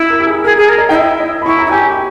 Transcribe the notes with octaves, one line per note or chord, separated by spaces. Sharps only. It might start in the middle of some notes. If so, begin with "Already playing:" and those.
Already playing: E4
A#4
G4
G#4
G#4 A#4
G#4
A#4
D#5
D#4 G5
E4 E5
D#5
B5
E4 C#6
A#5
E4
G4 G#5